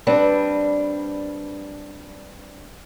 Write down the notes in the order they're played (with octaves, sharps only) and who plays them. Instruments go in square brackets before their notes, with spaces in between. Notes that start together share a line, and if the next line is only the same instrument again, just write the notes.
[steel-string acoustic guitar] G3 C4 D4 B4